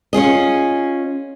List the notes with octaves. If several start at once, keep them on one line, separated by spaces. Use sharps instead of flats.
C#4 F4 G#4 D#5